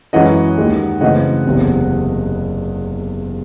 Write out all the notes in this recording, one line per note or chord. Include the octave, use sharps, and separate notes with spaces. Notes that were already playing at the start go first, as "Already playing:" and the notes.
F#2 E3 G#3 C#4 D#5 F#5
D#2 D#3 G#3
F#2 C#3 E3 A3 C4 D#5 F#5
F#1 E2 C3